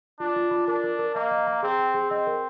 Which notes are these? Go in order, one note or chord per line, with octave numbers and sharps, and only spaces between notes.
D4 F4
F4
F4
D4 A#4
A#4
A#4
A#3 D#5
D#5
A#5
C4 G#4
G5
G#4
C4 D#5
A#4